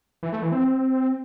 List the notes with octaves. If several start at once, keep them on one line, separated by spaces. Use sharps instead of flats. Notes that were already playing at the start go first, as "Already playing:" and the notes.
E3
A3
E3
C4